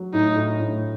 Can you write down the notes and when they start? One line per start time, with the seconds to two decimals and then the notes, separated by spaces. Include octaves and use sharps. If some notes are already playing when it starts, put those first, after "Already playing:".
Already playing: F#3
0.14 A2 D#4
0.36 A2
0.60 A2